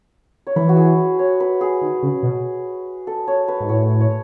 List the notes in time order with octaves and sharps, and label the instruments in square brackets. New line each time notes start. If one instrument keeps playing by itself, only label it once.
[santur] C#5
[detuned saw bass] E3 [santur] B4
[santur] F#4
G#4
C#5
B4
G#4
[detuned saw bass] D#3
C#3
B2
[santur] A4
C#5
B4
[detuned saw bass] G#2
[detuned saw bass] A2 [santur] C#5
[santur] C#5